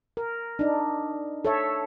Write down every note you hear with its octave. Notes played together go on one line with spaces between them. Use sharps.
A#4
D4 D#4
A4 C#5 E5